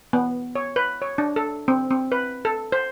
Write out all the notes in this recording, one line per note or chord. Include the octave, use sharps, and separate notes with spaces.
B3
C#5
B4
C#5
D4
A4
C4
C4
B4
A4
C5